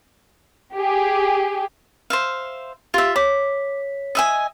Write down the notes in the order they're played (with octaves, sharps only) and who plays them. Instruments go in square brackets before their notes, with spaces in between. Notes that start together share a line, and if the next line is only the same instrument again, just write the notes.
[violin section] G4 G#4
[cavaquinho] C5 E5 F5
[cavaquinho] F4 E5 [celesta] G4 F5 C6
[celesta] C#5 B6 [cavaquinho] D6
[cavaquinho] D#5 E5 G#5